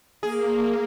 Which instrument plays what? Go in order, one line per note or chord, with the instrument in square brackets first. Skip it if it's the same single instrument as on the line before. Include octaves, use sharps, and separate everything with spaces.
[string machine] A#3 [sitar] G#4